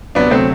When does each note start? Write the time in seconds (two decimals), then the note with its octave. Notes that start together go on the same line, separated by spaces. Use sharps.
0.15 D2 C3 F#3 B3 D4
0.31 A3 C4